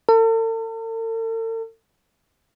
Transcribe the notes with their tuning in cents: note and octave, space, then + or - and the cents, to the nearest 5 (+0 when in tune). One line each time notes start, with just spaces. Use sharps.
A4 +45